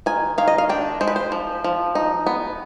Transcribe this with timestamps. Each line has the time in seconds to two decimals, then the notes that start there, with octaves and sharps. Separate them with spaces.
0.06 D#3 G#5
0.38 D#3 F5
0.48 D#5
0.58 F5
0.69 D4 G5
1.01 G#3 C5
1.07 B4
1.16 C5
1.32 F3
1.64 F3
1.95 D#4
2.26 B3